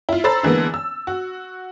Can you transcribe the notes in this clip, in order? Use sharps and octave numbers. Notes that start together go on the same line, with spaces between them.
E4 F4
A4 C5 A#5 B5 E6 A6
D3 E3 G#3 A#3 B3
E6
F#4